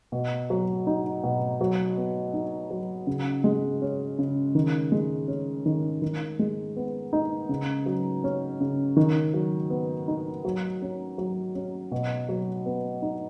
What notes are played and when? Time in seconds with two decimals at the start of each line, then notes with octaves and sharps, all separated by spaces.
0.12 B2
0.50 F#3
0.87 D#4
1.24 B2
1.61 F#3
1.97 B3
2.34 D#4
2.70 F#3
3.07 C#3
3.44 G#3
3.82 C#4
4.19 C#3
4.55 D#3
4.92 G#3
5.28 C#4
5.66 D#3
6.02 D#3
6.39 G#3
6.76 B3
7.13 D#4
7.49 C#3
7.86 F#3
8.24 C#4
8.60 C#3
8.97 D#3
9.34 F#3
9.70 B3
10.08 D#4
10.45 F#3
10.82 C#4
11.18 F#3
11.55 C#4
11.92 B2
12.29 F#3
12.66 B3
13.02 D#4